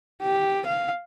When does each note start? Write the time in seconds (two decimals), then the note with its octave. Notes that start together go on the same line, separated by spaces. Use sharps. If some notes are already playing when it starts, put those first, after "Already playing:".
0.23 G4
0.66 F5